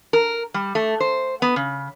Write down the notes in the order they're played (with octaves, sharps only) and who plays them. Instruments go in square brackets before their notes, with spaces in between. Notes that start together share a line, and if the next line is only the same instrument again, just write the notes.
[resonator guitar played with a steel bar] A#4
G3
A3
C5
B3
C#3